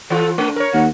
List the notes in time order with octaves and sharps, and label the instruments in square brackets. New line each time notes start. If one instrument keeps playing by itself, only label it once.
[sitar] E3 F4 [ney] A4
[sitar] A3 [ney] D4
[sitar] A#4 C#5
[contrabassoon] D#2 [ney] F#5